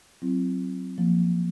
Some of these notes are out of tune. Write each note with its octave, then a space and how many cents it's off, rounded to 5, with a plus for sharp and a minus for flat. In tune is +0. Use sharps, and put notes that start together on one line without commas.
F#3 +0 C4 +5 E4 +40
F3 +0 A#3 +0